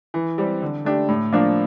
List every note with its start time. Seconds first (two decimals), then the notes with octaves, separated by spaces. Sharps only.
0.14 E3
0.38 G3 C4 G4
0.62 D3
0.85 A3 D4 G4
1.08 A2
1.32 F3 A#3 D4